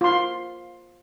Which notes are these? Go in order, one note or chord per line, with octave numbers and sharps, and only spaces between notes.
F4 C6